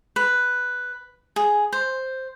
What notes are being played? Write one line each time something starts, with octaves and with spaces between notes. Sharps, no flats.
B4
G#4
C5